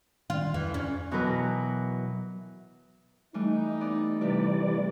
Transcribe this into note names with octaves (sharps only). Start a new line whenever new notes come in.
D#3 F4
F2 E3
C#4
B2 E3 F#3 A#4 B4
E3 G3 A3 D#4
B3 D5
C3 E3 G3 A3 G4 D5
A#1 G#2